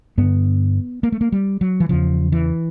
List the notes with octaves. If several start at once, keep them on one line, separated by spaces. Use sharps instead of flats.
G2 D3 B3
A#3
A3
A#3
G3
F#3
E3
E2 C#3 F3
E3